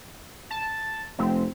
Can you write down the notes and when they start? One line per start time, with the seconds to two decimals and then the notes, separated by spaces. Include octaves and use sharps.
0.51 A5
1.19 F1 C4